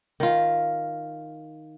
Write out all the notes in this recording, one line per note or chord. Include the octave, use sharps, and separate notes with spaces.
D#3 F4